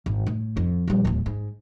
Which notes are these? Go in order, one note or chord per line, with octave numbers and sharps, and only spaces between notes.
G#1
A2
F2
A#1 G3
D1 D#2
G#2